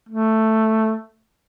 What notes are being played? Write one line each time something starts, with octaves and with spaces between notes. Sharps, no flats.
A3